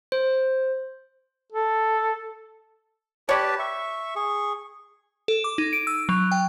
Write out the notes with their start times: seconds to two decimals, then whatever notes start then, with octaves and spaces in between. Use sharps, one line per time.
0.12 C5
1.52 A4
3.29 G4 B4 C#5 D5 A5
3.59 E5 C#6
4.16 G#4 C#6
5.28 A4
5.44 D6
5.58 D#4
5.73 D7
5.87 E6
6.09 F#3
6.32 G5